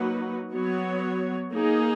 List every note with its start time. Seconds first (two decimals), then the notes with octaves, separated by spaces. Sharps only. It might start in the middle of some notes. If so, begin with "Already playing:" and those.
Already playing: F#3 A#3 D#4 F#4 B4
0.52 F#3 B3 F#4 C#5
1.52 A#3 D#4 G#4